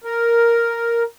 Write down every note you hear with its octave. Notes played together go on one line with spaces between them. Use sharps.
A#4